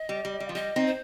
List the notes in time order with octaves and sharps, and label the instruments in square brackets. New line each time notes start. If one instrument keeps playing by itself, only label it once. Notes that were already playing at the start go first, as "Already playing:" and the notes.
Already playing: [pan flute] D#5
[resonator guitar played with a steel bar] G3
G3
G3
F3
[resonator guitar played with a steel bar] G3 [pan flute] D#5
[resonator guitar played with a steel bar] C4 D#4
[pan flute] C5